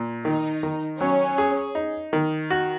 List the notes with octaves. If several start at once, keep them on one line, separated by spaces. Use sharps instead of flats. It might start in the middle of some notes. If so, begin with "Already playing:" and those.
Already playing: A#2
D#3 D#4
D#3
F#3 C#4
G#4
D#4
D#3
F#4